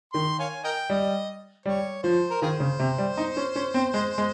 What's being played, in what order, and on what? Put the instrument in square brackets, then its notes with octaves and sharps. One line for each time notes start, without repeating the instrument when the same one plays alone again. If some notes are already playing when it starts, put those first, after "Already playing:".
[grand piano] D#3 [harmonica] C6
[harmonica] C#5 F5 G#5
A#4 D#5 G5
[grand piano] G3 [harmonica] D#5
[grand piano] G3 [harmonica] C#5
[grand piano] F3 [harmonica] C5
[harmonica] A#4
[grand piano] D#3 [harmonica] F4 G#4 C5
[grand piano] C#3
C3
G3
D#4
C#4
C#4
C4
G#3
G#3